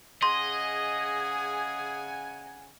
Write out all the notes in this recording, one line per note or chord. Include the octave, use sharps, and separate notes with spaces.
C#3 G#4 D#5 F#5 G#5 C6